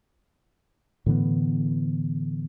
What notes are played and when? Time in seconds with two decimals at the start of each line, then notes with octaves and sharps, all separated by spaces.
1.06 A2 D3 E3 B3